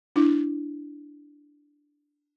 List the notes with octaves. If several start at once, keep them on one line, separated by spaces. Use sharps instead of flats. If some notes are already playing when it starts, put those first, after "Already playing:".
D4 E4